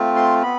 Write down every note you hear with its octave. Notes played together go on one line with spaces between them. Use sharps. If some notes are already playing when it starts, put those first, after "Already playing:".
Already playing: A3 C4 F4
C6
B3 B5